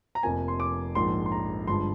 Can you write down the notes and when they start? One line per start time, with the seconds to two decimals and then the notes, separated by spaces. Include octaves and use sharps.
0.15 A#5
0.23 F1 F2 C3 F3 A#3 G#5
0.48 C6
0.60 D6
0.95 A#1 G#2 F3 A#3 C6
1.26 C6
1.32 A#5
1.67 G1 G2 F3 G#3 C6